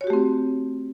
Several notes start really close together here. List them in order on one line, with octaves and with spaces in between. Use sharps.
C#5 F#4 G4 A3 C4